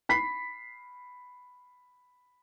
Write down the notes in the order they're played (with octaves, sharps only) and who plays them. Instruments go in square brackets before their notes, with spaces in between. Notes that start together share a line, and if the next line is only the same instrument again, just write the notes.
[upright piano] B5 B6 C7